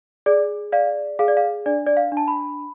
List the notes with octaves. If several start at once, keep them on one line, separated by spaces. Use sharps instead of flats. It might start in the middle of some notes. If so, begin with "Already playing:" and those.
G#4 D5
D5 F5
G#4 F5
D5
F5
D4 D5
D5
F5
D4
A5
B5